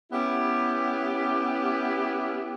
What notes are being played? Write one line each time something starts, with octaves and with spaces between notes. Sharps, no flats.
B3 C#4 E4 G4